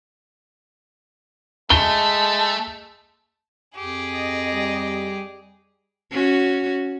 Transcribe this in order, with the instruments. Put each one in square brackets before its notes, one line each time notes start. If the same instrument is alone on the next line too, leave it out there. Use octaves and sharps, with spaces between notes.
[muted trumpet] G#3 [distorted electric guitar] A3 [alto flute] A5 [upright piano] G7
[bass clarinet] F2 [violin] G4 G#4
[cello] D#5
[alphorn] G3
[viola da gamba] C#4 F#4